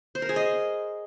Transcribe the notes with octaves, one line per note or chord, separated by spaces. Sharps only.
C5
A#4
G#4
D#5